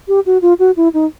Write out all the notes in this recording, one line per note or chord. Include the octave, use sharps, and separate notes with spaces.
G4
F#4
F4
F#4
E4
D#4